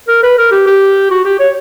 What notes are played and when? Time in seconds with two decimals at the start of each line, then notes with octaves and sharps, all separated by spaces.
0.08 A#4
0.23 B4
0.38 A#4
0.51 G4
0.67 G4
1.11 F#4
1.25 G4
1.39 C#5